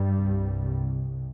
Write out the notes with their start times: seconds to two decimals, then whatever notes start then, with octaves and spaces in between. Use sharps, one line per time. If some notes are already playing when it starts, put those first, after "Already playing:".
Already playing: G2 G3
0.14 C2 C3